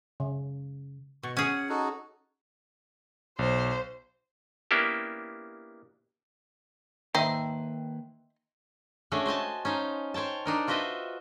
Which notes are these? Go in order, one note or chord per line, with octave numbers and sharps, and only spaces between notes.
C#3
B2 C#6
C#4 G#4 F#5
D#4 F#4 A4
B1 C5
A#3 B3 C#4 D4 E4 G4
D#3 A#3 D#4 B4 C5 E5 G5
A3 C#4 D4 F#4 G#4
C5 D#5 G#5 A5
C#4 D#4 C5 F5
C5 C#5 G5 A5
D4 D#4 A#4
F4 F#4 B4 C5 D#5 E5